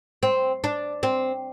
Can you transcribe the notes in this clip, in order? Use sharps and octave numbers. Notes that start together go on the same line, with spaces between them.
C4
D4
C4